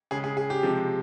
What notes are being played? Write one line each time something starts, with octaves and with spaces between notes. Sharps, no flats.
C#3 G#3 G#4
G#4
G#4
G4
C3 F3 G#3